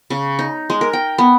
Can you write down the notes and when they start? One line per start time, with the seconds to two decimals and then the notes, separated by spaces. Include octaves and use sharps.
0.10 C#3
0.39 D#4
0.70 G#3
0.81 A#4
0.93 G5
1.18 B3